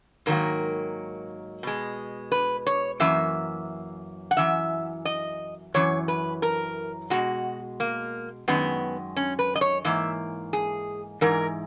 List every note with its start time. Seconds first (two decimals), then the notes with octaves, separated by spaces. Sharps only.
0.26 G#2 D#3 F#3 A#3 A#4
1.63 B2 G#3
2.32 B4
2.67 C#5
3.00 F#2 E3 A#3 E5
4.31 F#5
4.37 F#2 E3 E5
5.05 D#5
5.74 F#2 E3 C#5
6.08 B4
6.42 A#4
7.10 B2 G#3 F#4
7.80 A#3
8.48 F#2 D#3 G#3 B3
9.17 C#4
9.39 B4
9.56 D#5
9.61 C#5
9.85 G#2 E3 A#3 E5
10.53 G#4
11.21 G#2 E3 A#4